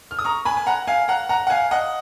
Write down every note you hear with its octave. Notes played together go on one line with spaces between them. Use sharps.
F6
D#6
A#5 C#6
G#5 B5
G#5
F#5 A#5
F5 G#5
F#5 A#5
F#5 A#5
F#5
F5 G#5
D#5 F#5